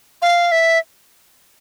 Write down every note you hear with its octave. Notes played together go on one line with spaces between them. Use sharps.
F5
E5